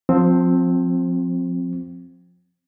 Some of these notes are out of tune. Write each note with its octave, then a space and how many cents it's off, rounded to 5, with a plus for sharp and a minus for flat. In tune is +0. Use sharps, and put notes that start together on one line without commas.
F3 +25 C4 +0